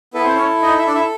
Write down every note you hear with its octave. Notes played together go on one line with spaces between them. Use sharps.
B3 E4 A4 B4
C4 C5
C#4 C#5
D#4 D#5
E4 E5
D4 D5
E4 E5